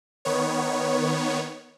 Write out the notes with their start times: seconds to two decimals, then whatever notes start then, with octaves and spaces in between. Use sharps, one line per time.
0.25 D#3 B3 C#5